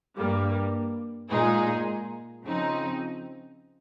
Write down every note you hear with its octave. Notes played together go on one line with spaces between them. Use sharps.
G2 G3 A#3
A#2 G#3 D#4 G#4
C#3 F3 C4 D#4